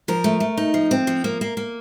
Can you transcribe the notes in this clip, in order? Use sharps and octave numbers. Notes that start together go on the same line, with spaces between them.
F3 A#4
A3
A3
D#4
F3
C4
F3
A#3
A#3
A#3